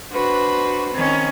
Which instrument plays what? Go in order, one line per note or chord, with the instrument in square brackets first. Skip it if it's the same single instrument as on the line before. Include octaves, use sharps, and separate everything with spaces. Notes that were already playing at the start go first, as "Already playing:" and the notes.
[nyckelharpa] D4 B4 [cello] F#4 C5
[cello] D#3 C#4 [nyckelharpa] C4